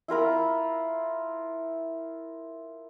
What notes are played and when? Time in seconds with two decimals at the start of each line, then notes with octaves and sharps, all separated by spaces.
0.08 E4 F4 A#4 B5